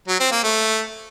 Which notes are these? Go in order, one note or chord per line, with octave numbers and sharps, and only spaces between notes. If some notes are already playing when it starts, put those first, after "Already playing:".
F#3
C4
A#3
A3